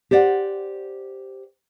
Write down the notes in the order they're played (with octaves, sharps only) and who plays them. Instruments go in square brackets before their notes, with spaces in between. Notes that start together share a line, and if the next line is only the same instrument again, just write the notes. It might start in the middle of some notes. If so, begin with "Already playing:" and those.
[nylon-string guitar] G4 C5 D5 F#5